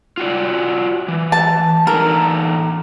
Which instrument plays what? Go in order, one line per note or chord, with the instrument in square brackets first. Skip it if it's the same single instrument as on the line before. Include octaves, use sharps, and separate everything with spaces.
[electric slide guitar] F4 F#4 D5
E3
[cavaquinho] A5
[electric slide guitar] E3 D#4 A4 [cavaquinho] A#4